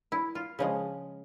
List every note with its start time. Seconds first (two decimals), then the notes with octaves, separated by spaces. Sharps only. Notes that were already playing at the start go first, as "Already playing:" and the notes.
0.12 E4
0.35 F4
0.59 C#3 F3 G#3